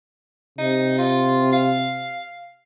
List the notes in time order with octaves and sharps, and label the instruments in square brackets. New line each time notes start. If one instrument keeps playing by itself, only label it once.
[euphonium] C3 [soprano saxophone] D#4
[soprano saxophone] F4
F5